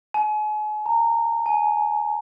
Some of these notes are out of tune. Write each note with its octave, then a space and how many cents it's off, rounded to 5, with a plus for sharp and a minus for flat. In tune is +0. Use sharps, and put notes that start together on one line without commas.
G#5 +40
A#5 -20
G#5 +25